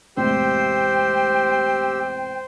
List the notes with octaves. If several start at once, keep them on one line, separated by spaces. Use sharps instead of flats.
E1 A2 C3 G4 C5 G5 E6